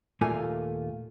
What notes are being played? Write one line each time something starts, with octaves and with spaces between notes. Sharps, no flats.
D#2 A#2 A3 A#3 F4 G#5